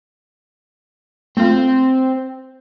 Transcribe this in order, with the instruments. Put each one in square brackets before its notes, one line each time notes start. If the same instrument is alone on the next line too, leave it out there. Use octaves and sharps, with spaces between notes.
[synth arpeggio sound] A3 F4 [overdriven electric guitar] C4